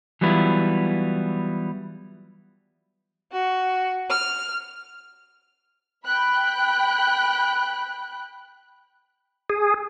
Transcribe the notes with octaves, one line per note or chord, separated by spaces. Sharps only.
E3 F#3 G3 B3 E4 F4
F#4
F6
G5 B5 F#6
G#4